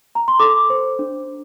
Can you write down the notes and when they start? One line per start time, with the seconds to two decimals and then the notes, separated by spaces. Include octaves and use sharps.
0.15 A#5
0.28 C6
0.39 A4 D6
0.70 C5
0.99 D4